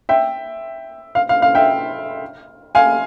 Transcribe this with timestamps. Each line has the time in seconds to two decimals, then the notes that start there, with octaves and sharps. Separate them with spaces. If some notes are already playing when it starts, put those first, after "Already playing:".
0.09 E5 G5
1.15 F5
1.29 F5
1.42 F5
1.55 E5 G5
2.75 F5 G#5